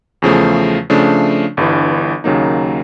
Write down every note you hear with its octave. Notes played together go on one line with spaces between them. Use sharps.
E2 C#3 F3 A3
C#3 F3 A3 D4
G1 G2 E3
D#2 C#3 F#3 A#3 D#4